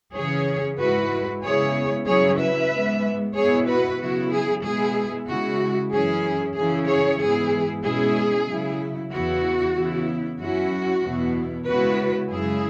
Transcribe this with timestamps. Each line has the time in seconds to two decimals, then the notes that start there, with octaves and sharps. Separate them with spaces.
0.15 C#3 E3 C#4 G#4 C#5
0.79 G#2 G#3 E4 F#4 B4
1.43 C#3 G#3 B3 E4 G#4 C#5
2.07 C#3 F#3 C#4 E4 G#4 C#5
2.39 B4 E5
2.71 G#2 G#3 B3
3.35 B2 B3 E4 G#4 C#5
3.67 F#4 B4
3.99 C#3 F#3 B3 E4 F#4
4.31 G#4
4.63 B2 G#3 B3 E4 G#4
5.27 C#3 G#3 E4 F#4
5.91 F#2 E3 C#4 E4 G#4
6.55 C#3 E3 C#4 E4 G#4
6.86 G#4 C#5
7.19 G#2 E3 B3 E4 G#4
7.83 B2 G#3 C#4 E4 G#4
8.46 C#3 F#3 E4
9.11 E2 C#3 E3 B3 E4 F#4
9.75 C#3 E3 B3 E4
10.39 F#2 F#3 C#4 E4 F#4
11.02 E2 B2 B3 E4
11.66 C#3 G#3 B3 E4 F#4 B4
12.31 F#2 C#3 G#3 E4 G#4